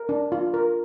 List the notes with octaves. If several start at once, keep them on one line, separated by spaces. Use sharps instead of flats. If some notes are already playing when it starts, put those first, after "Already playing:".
Already playing: A#4
D4
F4
A#4